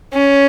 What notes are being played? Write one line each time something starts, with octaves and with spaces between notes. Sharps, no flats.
C#4